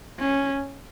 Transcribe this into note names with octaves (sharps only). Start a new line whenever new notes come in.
C#4